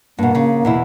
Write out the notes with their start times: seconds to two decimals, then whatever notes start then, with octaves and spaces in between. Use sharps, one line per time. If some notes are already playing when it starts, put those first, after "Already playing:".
0.19 G2 B2 A#3
0.35 C#3
0.65 E2 B2 E4